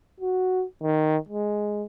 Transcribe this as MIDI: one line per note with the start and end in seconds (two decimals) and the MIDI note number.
0.20 0.64 66
0.83 1.17 51
1.29 1.84 56